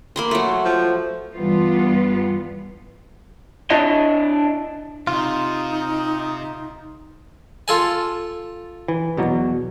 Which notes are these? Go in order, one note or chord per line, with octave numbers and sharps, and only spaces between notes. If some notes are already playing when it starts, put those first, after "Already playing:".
A#3 B5 C6
F#3 A3
F3
G2 E3 G3 B3 F4
D4 E4 C#5 D#5
C3 D#4 F4
F4 A4 G#5
E3
E2 B2 F#3